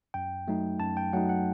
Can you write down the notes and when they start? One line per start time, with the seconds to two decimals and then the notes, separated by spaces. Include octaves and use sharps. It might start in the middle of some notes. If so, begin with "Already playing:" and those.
0.14 F#2 G5
0.47 F#3 A3 D#4
0.79 F#2 A5
0.97 G5
1.13 F#3 A3 D#4 F#5
1.29 F#5